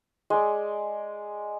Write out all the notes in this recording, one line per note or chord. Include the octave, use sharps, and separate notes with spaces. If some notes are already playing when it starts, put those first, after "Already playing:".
G#3 D5